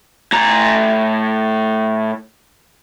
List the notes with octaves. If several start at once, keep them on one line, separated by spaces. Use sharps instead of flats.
A2 A#5